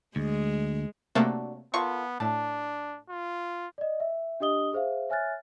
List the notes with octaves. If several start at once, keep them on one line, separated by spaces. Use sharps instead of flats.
D2 G#3
C3 F#3 A3 A#3 D4
A#3 B3 F4 A4 C#6
A2 D4 A5
F4
D5 D#5
E5
D4 G4 D#5 D#6 G7
G#4 C5 E5 F5
C#5 E5 G#5 F6 F#6 A6